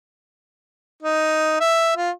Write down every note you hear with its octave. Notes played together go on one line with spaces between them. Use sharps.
D#4
E5
F4